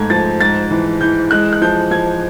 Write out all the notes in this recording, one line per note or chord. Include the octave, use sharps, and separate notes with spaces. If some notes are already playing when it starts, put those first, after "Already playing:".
Already playing: G#2 A3 G#6
F3 A6
G#2 A6
E3
E3 G6
G#3 F#6
F#6
F3 G6
F3 G#6